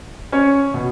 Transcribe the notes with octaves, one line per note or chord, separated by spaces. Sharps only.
C#4 C#5
B2